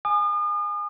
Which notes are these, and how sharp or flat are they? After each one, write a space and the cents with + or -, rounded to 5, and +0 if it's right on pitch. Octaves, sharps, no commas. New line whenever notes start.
G#5 +0 D#6 -40